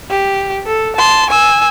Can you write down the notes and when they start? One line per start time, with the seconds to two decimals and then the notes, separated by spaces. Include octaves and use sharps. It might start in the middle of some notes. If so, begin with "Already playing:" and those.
0.10 G4
0.66 A4
0.96 A5 C6
1.30 G#5 E6